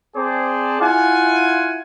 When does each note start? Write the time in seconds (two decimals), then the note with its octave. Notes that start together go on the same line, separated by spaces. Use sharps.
0.16 C4 G#4 C5 D5 A5
0.81 E4 F4 F#5 G#5